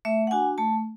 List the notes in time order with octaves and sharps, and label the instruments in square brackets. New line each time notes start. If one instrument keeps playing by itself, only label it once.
[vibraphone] A3 E5
F#5
D4 F#4 G#5
A3 A5